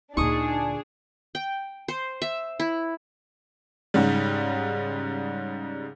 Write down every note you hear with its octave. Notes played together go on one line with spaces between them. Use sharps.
D2 A#2 D4 D#4 G#4 C#6 D#6
G5
C5
E5
E4
G#2 C#3 G3